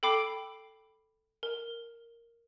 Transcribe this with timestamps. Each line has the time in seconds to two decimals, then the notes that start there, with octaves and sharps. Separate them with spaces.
0.03 A4 G5 B5 D6 C7 D7
1.43 A#4